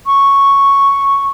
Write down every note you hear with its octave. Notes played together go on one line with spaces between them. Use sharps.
C#6